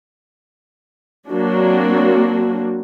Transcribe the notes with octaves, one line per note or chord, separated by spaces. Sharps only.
F#3 A#3 C4 D4 F#4